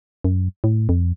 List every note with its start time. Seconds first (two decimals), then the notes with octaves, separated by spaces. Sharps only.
0.24 F#2
0.64 A2
0.89 F2